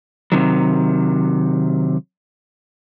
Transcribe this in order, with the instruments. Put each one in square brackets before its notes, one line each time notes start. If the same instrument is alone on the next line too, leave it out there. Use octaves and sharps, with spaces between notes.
[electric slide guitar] C3 D#3 F#3